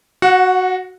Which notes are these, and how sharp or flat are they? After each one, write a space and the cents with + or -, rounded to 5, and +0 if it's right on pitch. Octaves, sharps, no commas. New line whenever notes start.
F#4 +0 F#5 -30